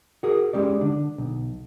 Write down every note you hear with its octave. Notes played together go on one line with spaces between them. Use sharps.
F#4 G#4 A#4
G#3 C#4 G4 D5
D3 D4
B1